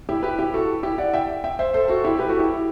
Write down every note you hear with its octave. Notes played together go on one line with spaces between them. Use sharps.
E4 G4
G4 B4
E4 G4
F#4 A4
E4 G4
D5 F#5
E5 G5
E5 G5
C5 E5
A4 C5
F#4 A4
E4 G4
G4 B4
F#4 A4
E4 G4